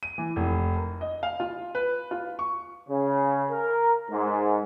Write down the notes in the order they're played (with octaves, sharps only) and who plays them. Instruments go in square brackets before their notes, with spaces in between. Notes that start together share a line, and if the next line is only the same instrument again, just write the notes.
[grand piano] D#7
E3
F1
A#4
D#5
F5
F4
B4
F4
C#6
[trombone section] C#3
A#4
G#2